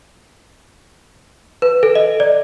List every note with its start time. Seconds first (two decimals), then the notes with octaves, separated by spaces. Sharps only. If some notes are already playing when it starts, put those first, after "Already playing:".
1.62 B4
1.83 A4
1.95 D#5
2.20 D5